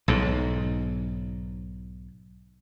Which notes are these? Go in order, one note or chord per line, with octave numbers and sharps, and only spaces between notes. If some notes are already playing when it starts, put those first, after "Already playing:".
B1 G#2